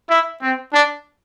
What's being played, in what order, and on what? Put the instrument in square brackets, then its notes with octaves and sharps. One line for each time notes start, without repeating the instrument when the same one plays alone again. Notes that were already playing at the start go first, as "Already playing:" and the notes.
[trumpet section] E4
C4
D4